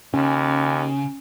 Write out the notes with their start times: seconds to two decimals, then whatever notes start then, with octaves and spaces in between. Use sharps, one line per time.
0.14 D#2 C#3 C#4